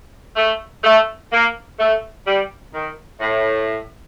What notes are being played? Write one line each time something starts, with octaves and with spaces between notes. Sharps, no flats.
A3
A3
A#3
A3
G3
D#3
A2